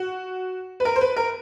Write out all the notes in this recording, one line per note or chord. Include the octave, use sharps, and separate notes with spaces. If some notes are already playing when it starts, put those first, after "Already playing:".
Already playing: F#4
B4
A#4
C5
B4
A#4